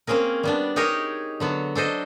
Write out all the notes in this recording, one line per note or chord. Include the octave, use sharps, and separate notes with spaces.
A#3 C4 C#4 G#4 A#4
G3 B3 D4
D#4 G4 G#4 A#4 C#5 D#5
D3 F#3 B3
D4 A4 C5 D#5